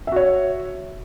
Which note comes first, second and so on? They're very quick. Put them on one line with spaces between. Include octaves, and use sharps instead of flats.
E5 F#4 C#5